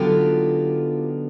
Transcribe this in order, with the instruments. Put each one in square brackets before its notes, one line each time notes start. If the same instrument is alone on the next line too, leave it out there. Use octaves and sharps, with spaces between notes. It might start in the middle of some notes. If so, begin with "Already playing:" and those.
Already playing: [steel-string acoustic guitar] D3 F#3 B3 D#4 F4 G4